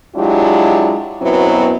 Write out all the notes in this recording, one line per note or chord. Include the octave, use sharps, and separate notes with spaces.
F#3 G#3 D4 E4 F4 G4
F#2 B2 F#3 B3 C4 E4